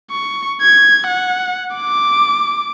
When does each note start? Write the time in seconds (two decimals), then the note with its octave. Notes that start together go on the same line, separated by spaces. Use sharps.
0.12 C#6
0.62 G#6
1.07 F#5
1.77 D6